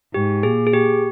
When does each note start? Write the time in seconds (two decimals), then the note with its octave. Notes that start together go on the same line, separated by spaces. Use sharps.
0.13 G#2 G4
0.43 A#2 G#4
0.67 G#4
0.73 G4